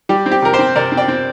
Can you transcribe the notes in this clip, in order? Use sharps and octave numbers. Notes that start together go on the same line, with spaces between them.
G3 G4
C4
G4
C3 A#4
G4 C5
C4
C3 A#4 D5
C4
D5 G5
C4